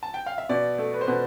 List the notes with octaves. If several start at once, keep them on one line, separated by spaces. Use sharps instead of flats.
A5
G5
F5
E5
B2 D5
A3
B4
C5
B2 B4